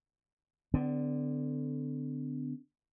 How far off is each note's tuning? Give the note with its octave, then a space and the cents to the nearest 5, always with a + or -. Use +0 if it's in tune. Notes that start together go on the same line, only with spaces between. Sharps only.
D3 +0 B3 +45